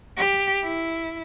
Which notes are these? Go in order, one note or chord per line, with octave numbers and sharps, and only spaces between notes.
G4
E4